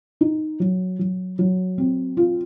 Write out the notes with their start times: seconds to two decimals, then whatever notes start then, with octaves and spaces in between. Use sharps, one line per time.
0.21 D#4
0.60 F#3
0.99 F#3
1.39 F#3
1.78 C4
2.17 F4